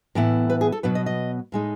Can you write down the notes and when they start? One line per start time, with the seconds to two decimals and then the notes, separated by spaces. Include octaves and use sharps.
0.15 A2 E3 B3 E4
0.50 B4
0.61 G#4
0.72 A4
0.83 B2 F#3 B3 B4
0.95 D#5
1.06 D#5
1.52 A2 G#3 D#4